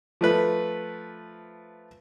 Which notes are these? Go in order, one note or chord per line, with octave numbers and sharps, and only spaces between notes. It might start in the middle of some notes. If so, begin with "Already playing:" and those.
F3 A3 B4